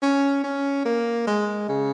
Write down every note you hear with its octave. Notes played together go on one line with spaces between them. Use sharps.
C#4
C#4
A#3
G#3
C#3